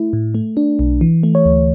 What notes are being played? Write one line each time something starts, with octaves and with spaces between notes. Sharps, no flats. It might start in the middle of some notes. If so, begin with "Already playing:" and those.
Already playing: A3 E4
A2
A3
D4
B1
E3
A3
C#5
D2